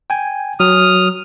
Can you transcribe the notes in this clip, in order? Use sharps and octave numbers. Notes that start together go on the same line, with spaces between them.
G5 G#5
F#3 D#6 F6